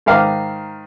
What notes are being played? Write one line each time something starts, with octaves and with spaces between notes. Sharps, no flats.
G#2 D#3 B4 F5 A#5 D6